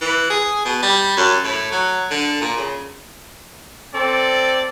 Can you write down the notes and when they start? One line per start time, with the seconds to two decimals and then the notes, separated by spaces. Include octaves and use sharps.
0.01 E3
0.30 G#4
0.65 B2
0.82 G3
1.17 F#2
1.44 A2
1.72 F#3
2.10 D3
2.41 A#2
2.57 C#3
3.94 C4 A4 D5